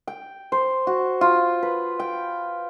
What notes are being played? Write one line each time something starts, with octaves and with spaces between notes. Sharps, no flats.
G5
C5
F#4
F4
B4
G5